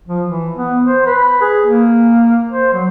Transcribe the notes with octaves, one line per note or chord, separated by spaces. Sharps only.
F3
E3
B3
C5
B4
G#4
A#3
C5
F#3